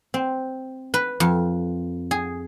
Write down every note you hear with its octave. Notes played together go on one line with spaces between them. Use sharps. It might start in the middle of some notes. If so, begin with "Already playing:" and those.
C4
B4
F2
G#4